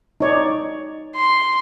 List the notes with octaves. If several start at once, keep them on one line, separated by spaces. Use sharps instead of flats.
D#4 C#5 D5
C6